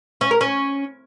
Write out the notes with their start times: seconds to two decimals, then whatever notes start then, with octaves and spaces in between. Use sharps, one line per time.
0.21 C#4
0.31 A#4
0.41 C#4